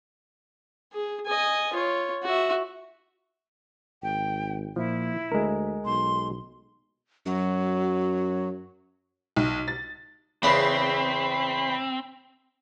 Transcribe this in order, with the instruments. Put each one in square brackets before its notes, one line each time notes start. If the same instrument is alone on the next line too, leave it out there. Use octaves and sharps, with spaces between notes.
[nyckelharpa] G#4
D#5 G#5
F4 C#5
F#4 E5
[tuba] G#1 [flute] G5
[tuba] A#2 [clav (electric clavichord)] F3 [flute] E4
[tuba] D2 [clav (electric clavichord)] G#3 A#4
[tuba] B1 [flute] C6
[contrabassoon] F#2 [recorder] F#3
[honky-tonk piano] B1
A6
[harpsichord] E2 C#3 [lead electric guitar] C4 [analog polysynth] B5 B6 C7